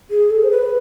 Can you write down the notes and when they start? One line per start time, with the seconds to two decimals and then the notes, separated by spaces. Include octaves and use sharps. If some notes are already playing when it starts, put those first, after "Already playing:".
0.11 G#4
0.30 A4
0.44 C5
0.51 B4